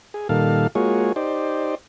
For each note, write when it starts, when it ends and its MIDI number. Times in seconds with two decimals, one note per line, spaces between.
0.14 0.28 68
0.29 0.67 46
0.29 0.67 51
0.29 0.67 55
0.29 0.67 69
0.29 0.67 77
0.75 1.12 56
0.75 1.12 58
0.75 1.12 65
0.75 1.12 66
0.75 1.12 68
0.75 1.12 73
1.16 1.75 63
1.16 1.75 67
1.16 1.75 72
1.16 1.75 74